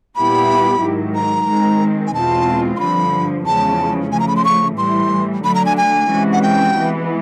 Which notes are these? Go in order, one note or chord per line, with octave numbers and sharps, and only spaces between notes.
A#2 G3 B3 E4 G4 B5
G#2 D#3 F#3
A#5
D#3 G#3 C4
G#5
E2 B2 G#3 C4 F4 A5
C6
G2 D3 F3 B5
E2 C#3 F3 G#3 C#4 A5
C#3 F3 A3 G#5
A#5
B5
C6
C#6
A2 E3 G3 C6
D3 F#3 A3 D4 B5
A#5
G#5
G#5
C3 E3 G#3 C#4 F#4
F#5
G5
E3 G#3 B3